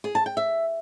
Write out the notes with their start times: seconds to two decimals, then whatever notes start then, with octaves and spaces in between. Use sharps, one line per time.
0.04 G#4
0.15 A5
0.26 G5
0.37 E5